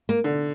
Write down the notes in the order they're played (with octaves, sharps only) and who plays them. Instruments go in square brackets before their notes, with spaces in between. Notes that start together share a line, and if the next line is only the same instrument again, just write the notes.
[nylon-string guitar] A#3
[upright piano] D3